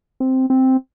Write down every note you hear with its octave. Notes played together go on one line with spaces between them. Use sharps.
C4
C4